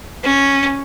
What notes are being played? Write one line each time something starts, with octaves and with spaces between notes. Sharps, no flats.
C#4